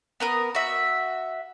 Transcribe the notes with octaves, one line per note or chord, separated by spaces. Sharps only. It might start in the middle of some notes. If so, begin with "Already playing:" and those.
B3 A#4 D#6
F#4 E5